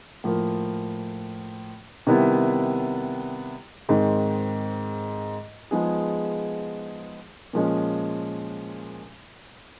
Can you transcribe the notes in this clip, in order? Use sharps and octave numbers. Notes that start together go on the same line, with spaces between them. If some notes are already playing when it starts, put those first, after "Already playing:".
A2 F3 A#3
C3 D#3 G3 B3 E4
G#2 D#3 G#3 C4
F3 G#3 B3 D#4 G#4
A#2 F3 G#3 C#4